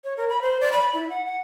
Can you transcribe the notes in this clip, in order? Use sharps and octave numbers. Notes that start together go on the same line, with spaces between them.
C#5
A#4
B5
C5
D5
B5
E4
F#5
F#5